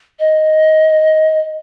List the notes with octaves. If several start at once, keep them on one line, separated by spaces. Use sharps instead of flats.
D#5